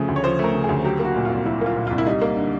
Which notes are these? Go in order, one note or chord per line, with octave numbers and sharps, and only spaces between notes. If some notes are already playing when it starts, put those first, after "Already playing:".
Already playing: C#3 F3 A3
D2
C#5
F3 C5
A3
A#4
C#3
G#4
D2
F#3 G4
A#3
F#4
A#2
C2 F4
F#3 E4
A#3 F4
A#2
C2 F4
E4
G3 D#4
A#3
D3